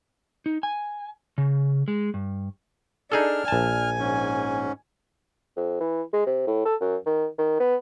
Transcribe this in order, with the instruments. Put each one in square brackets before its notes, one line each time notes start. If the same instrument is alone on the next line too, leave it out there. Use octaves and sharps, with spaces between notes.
[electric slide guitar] D#4
G#5
C#3
G#3
G2
[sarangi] D4 [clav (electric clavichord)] D#4 G#4 A4 [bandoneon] F6
[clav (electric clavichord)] A#1 A5 [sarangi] G#5
[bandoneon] G#2 C#4
[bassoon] F2
E3
G#3
C3
A2
A4
F#2
D#3
D#3
B3